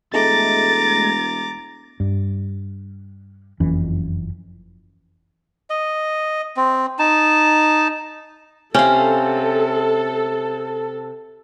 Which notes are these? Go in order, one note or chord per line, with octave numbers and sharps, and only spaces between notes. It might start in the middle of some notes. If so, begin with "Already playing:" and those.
E1 G#3 A3 A#5 D6 A6
G2
F#1 F2 E3 C#4
D#5
C4
D#4 A5
C3 C#4 A4 F5